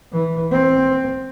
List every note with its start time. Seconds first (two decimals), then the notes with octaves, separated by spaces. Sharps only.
0.12 E3
0.51 C4